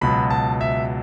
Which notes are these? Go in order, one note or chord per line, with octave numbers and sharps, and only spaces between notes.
C#2 B2 F#3 B5
A5
E5